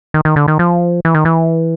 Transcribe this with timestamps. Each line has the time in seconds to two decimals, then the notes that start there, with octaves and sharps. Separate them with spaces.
0.14 D#3
0.25 D#3
0.36 D3
0.48 D#3
0.59 F3
1.05 E3
1.14 D#3
1.25 E3